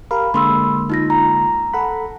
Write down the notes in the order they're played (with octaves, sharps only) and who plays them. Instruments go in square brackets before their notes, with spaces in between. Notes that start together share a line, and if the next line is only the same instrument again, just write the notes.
[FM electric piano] G4 A#4 F5 [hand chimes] B5
[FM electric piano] D3 G#3 A#3 [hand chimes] B5 C6 E6
[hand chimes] D#4 F4 A#6
A#5
[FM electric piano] A4 F#5 B5